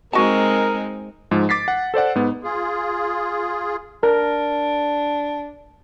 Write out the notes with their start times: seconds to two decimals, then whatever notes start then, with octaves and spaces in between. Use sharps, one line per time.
0.13 G#3 C4 D#4 F#4 A#4 A5
1.31 G#2 F3 G#3
1.49 D6 A6 B6 C7
1.68 F#5
1.94 A4 C5 D5 F#5
2.15 G#2 B3
2.43 F4 G#4
4.03 D4 A#4